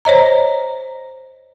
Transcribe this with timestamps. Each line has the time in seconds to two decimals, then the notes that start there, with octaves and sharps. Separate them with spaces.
0.05 C5 C#5 D#5 A#5